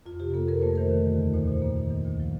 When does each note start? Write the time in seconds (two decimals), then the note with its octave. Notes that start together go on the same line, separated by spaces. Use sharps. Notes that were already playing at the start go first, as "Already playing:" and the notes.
0.06 F2 F4
0.20 C3 G4
0.34 A#3 A4
0.48 F2 A#4
0.61 A3 C5
0.75 D#3 A#4
0.91 D3
1.06 D#2
1.20 D#2
1.33 A#2 C5
1.48 A#2
1.62 A#3
1.77 D#3
1.90 D#3
2.05 D2
2.20 F3